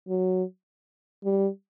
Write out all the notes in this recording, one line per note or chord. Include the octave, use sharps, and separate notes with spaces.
F#3
G3